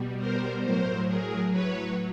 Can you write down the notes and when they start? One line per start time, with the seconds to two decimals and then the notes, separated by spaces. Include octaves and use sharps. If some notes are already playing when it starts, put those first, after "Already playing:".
Already playing: B2 G3
0.19 A#4 C5
0.63 A2 F#3 A#4 C5
1.07 G#4 A#4
1.52 B4 C#5